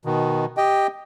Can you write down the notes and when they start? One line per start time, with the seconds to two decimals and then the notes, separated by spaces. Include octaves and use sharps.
0.05 B2 D#3
0.57 G4 D#5 G5